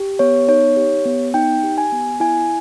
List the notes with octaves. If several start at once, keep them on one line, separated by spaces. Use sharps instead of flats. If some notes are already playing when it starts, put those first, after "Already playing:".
Already playing: G4
B3 C#5
D#4 C#5
G4
B3
D#4 G5
G4
G#5
B3
E4 G#5